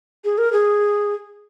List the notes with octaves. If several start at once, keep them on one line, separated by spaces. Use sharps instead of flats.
G#4
A#4
G#4